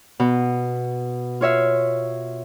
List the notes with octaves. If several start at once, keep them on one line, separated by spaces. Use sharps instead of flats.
B2
F4 C#5 E5 F5